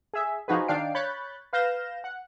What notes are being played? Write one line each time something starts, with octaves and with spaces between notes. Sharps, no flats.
G#4 E5
F3 D#4 F#4 G#4 B4
D#3 D4 F5 G5 C7 D7
C#5 B5 F#6 G6 A6
B4 F5 G6 A#6 E7
F#5